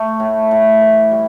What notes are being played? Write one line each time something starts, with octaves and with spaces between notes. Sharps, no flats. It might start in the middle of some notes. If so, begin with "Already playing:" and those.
Already playing: A3
A2
A2
E3
G3